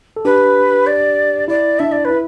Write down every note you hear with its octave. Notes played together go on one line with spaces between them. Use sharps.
A4
D4 G4 B4
D5
E4 D5
D4 E5
D5
B4
E4